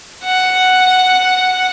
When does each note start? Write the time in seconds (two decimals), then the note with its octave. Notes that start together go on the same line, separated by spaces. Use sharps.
0.24 F#5